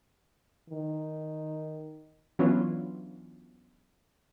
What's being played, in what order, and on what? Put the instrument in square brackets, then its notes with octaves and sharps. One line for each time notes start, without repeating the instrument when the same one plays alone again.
[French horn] D#3
[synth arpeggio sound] E3 F#3 B3 C#4 D4 F4